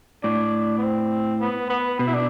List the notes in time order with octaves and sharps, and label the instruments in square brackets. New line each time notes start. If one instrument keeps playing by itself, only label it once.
[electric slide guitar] A2 [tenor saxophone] D4
[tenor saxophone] B3
C4
B3
B3
[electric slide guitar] B2 [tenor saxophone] B3
[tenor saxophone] E4
D4